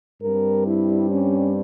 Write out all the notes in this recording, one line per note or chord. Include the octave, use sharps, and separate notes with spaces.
G2 G3 C4 A#4
E4
C#4